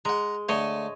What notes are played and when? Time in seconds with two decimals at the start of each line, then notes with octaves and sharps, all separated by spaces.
0.05 G#3 F#5 A#5
0.49 D3 A3 C#5 D#5